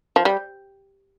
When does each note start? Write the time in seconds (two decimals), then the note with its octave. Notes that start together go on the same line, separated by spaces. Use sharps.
0.16 F3
0.25 G3